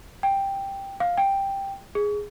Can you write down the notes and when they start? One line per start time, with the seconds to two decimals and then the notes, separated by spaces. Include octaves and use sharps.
0.23 G5
1.00 F5
1.18 G5
1.95 G#4